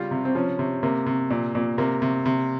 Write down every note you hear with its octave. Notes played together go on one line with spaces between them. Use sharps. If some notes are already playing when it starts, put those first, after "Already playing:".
Already playing: C#3 G3 F4
C3
C4
F3 C#4
C3
C3 A#3
C3
A#2
A#2
C3 A#3
C3
C3